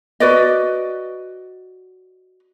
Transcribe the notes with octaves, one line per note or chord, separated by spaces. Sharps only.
F#4 B4 D5 D#5